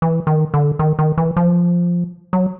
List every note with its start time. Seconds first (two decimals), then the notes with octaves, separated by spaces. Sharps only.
0.02 E3
0.27 D#3
0.54 D3
0.79 D#3
0.99 D#3
1.18 E3
1.37 F3
2.33 F#3